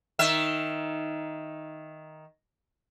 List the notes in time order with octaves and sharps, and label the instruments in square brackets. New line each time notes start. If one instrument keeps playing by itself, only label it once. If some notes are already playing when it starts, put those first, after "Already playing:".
[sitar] D#3 E5